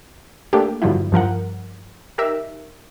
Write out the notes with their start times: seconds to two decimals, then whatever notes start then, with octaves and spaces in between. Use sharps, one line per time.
0.53 A3 A#3 D4 G4
0.82 G2 D3 F3 F#3 E4
1.12 G2 F3 A#4 F#5
2.18 D#4 G4 A#4 E5